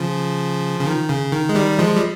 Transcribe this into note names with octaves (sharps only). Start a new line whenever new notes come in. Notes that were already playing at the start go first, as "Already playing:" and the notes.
Already playing: C#3 F3
C#3
D#3
C#3
D#3
G#3
D#3 G3
F3 G#3
G3